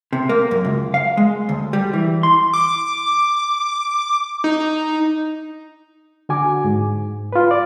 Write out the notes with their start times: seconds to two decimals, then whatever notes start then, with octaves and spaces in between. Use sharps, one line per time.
0.13 C3
0.29 A#3
0.51 F#2
0.65 C#2
0.94 F5
1.17 G#3
1.49 D2
1.73 G3
1.93 E3
2.23 C6
2.53 D6
4.44 D#4
6.29 D3 F#4 G#5 D6
6.64 G#2
7.33 F4 B4
7.51 D5